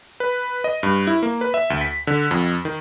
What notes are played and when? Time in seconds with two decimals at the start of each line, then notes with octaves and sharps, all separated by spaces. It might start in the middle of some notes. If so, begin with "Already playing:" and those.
0.20 B4
0.64 D#5
0.83 G2
1.07 E4
1.23 A#3
1.41 B4
1.54 E5
1.70 D2
1.81 B6
2.07 D3
2.31 F2
2.65 D#3